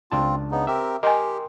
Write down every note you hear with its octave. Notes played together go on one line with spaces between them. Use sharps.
C#2 C4 D4 F4 A5
C#3 B3 D#4
C4 G4 A#4 E5
G4 A#4 D#5 G5 G#5 C6